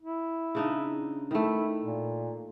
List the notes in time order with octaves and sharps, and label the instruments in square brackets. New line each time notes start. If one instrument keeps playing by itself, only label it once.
[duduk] E4
[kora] C#3 D4 D#4
[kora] D#3 A3 [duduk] E4
[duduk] A#2